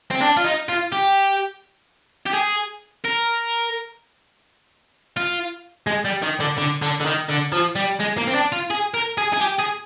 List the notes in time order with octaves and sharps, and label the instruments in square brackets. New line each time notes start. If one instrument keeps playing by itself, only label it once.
[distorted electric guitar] C4
D4
F4
D#4
F4
G4
G4
G#4
A#4
F4
G#3
G3
D#3
D3
D3
D3
D3
D#3
D3
F3
G3
G#3
A#3
C4
D4
F4
G#4
A#4
G#4
G#4
G4
G#4